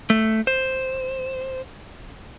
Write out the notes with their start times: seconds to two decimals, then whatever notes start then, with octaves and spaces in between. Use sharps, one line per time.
0.10 A3
0.47 C5